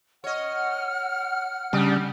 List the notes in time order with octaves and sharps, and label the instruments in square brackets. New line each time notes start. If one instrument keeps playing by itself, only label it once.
[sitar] C#5 D#5 [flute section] F#5 F6
[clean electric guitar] C#3 [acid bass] G3 [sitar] D4 G4